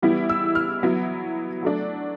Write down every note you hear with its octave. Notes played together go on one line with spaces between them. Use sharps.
E3 G3 B3 E4
E6
F6
F#3 B3 E4
F#3 A3 D4